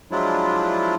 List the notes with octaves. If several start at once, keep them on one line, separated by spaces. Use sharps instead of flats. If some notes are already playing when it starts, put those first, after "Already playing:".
F3 F#3 G#3 D4 E4 F4